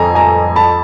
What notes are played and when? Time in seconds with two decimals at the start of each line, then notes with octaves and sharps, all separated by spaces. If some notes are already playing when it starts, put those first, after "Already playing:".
Already playing: F2 G#5 A#5
0.15 G#5 A#5
0.56 A5 B5